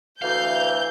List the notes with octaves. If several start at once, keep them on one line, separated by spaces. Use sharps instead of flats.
D2 E3 F5 G6